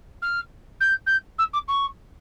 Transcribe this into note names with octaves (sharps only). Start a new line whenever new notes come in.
F6
G6
G6
E6
D6
C#6